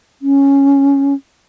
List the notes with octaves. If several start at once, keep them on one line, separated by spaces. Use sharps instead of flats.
C#4